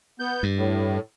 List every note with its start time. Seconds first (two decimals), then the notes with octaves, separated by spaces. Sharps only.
0.20 B3 G6
0.43 G2
0.57 A2